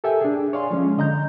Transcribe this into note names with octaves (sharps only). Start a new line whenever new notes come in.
G4 A4 A#4 E5 G5 G#5
D4 G#4
C#5 D5 F5 G#5 C6
F3 G#3 C#4 F4
D3 D#5 A#5 G6